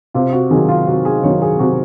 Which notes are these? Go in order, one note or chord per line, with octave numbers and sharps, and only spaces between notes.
C3 F4
F#4
D#3 F#3 G#4
F4
C3 F#4
G#4
D#3 F#3 C#5
G#4
C3 F#4